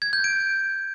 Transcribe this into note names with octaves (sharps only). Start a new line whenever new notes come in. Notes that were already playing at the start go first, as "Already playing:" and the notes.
G#6
G6
D7